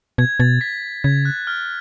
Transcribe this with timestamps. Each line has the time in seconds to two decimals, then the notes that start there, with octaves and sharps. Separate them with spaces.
0.18 B2 G#6
0.40 B2 A6
0.61 B6
1.04 C#3 G#6
1.25 F#6
1.47 F6